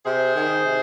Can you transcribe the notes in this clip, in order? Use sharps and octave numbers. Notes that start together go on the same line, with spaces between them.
C3 G#4 C5
D#3
C3